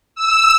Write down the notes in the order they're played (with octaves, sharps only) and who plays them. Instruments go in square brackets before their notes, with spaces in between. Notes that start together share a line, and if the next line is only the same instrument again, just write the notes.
[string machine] E6